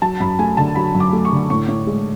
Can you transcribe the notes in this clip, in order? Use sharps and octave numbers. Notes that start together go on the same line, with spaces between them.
F#3 A5
F#2 B5
A3 G#5
D3 A5
F#3 B5
F#2
D6
A3
C#6
D3
A2 C#6
A2
G#3